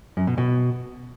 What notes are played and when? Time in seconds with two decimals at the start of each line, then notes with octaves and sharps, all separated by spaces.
0.17 F#2
0.27 B2
0.38 B2